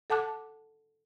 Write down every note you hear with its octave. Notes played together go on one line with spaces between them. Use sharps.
A4 F#5 A5 D6 F#6